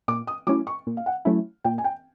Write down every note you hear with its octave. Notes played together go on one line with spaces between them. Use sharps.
A#2 D6
D#6
F#3 A3 C#4 E4 D6
C#6
A#2
F5
F#5
F#3 A3 C#4 E4
A#2 G5
G#5
G5